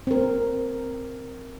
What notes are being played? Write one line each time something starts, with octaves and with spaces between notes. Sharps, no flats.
C4 A#4